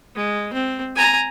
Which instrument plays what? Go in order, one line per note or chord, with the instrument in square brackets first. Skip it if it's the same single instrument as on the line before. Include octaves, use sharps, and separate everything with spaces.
[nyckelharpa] G#3
C4
G#5 A#5